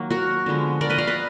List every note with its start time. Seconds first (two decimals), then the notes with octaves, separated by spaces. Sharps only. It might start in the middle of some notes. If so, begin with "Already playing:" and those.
Already playing: D#3 F#3 A#3
0.10 F#4 A#4
0.46 D3 F3 G#3 B3
0.81 A#4 D5
0.89 B4 D#5
0.98 D5 F5
1.07 B4 D#5